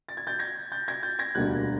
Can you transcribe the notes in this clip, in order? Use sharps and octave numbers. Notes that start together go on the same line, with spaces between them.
A6
G#6
G6 A6
G#6 A#6
G6 A6
G#6 A#6
G6 A6
G#6 A#6
E1 D2 D3 G3 A#3 F#6 G#6